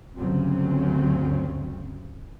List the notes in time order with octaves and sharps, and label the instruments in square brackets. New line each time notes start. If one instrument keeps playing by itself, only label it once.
[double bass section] D2 G2 C#3 F#3 C4 C#4